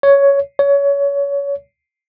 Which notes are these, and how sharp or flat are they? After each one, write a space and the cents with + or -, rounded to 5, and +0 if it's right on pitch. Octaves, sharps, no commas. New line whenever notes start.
C#5 +10
C#5 +25